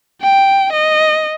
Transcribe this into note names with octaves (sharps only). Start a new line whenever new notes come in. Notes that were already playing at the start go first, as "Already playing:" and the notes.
G5
D#5